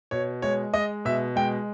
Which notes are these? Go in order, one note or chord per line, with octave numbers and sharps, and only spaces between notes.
B2 C#5
G#3 C#5
G#3 D#5
B2 E5
G#3 G5